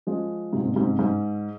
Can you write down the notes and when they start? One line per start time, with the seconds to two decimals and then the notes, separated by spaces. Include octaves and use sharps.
0.07 F3 G#3
0.53 G#2 C3
0.66 A#2
0.76 G#2 C3
0.99 G#2